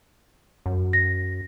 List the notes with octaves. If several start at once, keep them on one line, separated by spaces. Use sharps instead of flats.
F#2
A#6